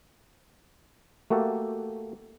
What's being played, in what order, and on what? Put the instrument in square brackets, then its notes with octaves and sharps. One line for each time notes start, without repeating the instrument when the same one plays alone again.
[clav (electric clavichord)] A3 A#3 F#4 G4 A4